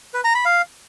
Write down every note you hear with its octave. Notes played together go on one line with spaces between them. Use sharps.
B4
A#5
B5
F5